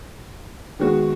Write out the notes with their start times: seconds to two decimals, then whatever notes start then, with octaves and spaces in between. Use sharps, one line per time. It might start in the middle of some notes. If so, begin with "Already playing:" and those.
0.79 D#3 G#3 B3 F#4